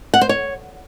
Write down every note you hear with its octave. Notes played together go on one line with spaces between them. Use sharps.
F#5
C5
C#5